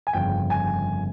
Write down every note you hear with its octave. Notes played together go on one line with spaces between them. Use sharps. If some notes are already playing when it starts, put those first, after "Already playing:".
G#5
G1 F2 C#3 G5
G#5